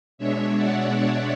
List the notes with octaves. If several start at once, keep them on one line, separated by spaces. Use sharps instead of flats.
B2 G#3 D4 C#5 E5
D5 F#5